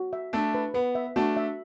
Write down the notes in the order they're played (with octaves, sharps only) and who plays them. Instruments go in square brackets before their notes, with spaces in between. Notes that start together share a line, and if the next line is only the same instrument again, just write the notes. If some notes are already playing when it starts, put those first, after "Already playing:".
Already playing: [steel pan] F#4
E5
[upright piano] A3 D4 [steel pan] E5
[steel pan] B4
[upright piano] B3 [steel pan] B4
[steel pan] E5
[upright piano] A3 D4 [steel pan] F#4
[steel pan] E5